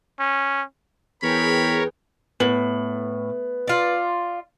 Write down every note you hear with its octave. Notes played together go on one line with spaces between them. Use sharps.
C#4
E2 G#4 A#4 B4 C#5 G5 B5
A2 B3 F#7
F4 D5